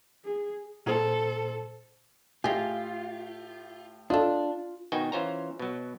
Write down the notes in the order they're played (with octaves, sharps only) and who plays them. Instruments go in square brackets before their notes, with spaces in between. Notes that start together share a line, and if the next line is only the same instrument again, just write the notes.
[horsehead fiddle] G#4
[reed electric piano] A#2 C5 [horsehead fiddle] A4
[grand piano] A2 G4 [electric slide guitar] F4 [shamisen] G#4 D#5 G#5
[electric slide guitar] D4 [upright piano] F4 [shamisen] A4 D#5
[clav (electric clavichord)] B2 D#3 D#4 F#4 G5 G#5
E3 C#4 F4 C5 C#5 A#5
B2 F#3